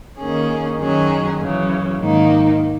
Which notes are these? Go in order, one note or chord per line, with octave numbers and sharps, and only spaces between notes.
D#3 A#3 C#4 G#4
F#2 D#3 F#3 C#4 G#4
F#2 C#3 E3
G#2 D#3 A#3 D#4